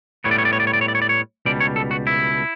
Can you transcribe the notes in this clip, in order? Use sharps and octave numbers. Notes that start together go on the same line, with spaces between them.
A2 G3 B3 C#5
D5
C#5
D5
C#5
D5
C#5
D5
C#5
D5
C#5
D5
C#5
C#2 B2 G3 D5
C#5
A4
F#4
E4